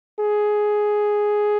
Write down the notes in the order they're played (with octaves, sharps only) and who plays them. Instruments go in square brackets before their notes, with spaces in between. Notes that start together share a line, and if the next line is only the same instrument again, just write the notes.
[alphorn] G#4